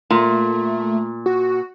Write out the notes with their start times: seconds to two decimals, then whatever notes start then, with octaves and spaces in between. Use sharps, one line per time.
0.10 A#2 A3
1.26 F#4